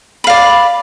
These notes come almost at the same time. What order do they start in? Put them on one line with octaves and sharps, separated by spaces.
B5 F5 D5